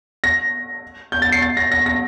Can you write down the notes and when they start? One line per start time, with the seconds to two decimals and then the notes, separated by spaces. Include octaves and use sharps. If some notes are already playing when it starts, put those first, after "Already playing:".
0.24 A#6
1.12 G6
1.22 A6
1.32 C7
1.42 A6
1.57 A#6
1.72 A#6
1.86 A#6